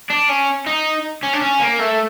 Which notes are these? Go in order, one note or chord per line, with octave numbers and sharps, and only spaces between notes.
D4
C#4
D#4
C#4
D4
C#4
A#3
A3